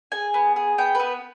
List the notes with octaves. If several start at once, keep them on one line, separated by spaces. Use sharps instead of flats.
G#4 G#5
B3
G#4
B3 G5
B3 B4